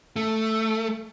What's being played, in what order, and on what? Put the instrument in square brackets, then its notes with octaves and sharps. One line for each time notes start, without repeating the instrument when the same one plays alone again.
[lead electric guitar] A3